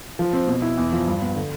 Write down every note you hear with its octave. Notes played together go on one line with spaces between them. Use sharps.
F3
C4
B2
E4
E2
F3
G2
B3
D3